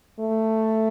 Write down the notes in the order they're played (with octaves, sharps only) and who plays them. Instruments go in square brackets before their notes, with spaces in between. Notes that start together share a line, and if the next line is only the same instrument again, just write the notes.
[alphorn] A3